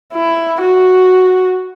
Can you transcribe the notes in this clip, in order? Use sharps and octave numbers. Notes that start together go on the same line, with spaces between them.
E4
F#4